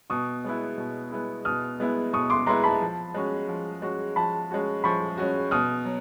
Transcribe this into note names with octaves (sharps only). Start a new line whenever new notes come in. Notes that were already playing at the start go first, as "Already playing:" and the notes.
B2 C#6 D#6
G#3 B3 E4
B2
G#3 B3 E4
B2 D#6 F6
G#3 B3 E4
B2 C#6 D#6
C6 D6
G#3 B3 E4 A#5 C6
A5 B5
F3
G#3 C#4 F#4
F3
G#3 C#4 F#4
F3 A5 B5
G#3 C#4 F#4
F3 B5 C#6
G#3 C#4 F#4
B2 D#6 F6
F#3